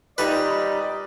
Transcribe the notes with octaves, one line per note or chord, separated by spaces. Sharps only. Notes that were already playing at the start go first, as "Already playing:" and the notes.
A#2 G3 D#4 B4 D5 D#5